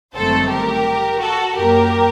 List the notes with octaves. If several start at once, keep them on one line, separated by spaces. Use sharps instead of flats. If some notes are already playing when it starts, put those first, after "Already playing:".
G1 F#2 D#3 A3 C4 A4 C5
G4 A#4
F#4 A4
F#2 F#3 A#3 G4 A#4